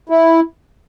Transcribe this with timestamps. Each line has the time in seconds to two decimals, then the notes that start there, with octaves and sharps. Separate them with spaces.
0.09 E4